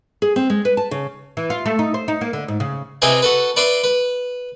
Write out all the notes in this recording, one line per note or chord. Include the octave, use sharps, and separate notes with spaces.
G#4
C4
G#3
B4
A5
C#3
E3
F4
A3
D#4
C5
D#4
A#3
D3
G#2
C#3
C3 C4 E4 B4 D#5 G#5
F#4 A4 B4
B4 D5 E5 B5 C6
B4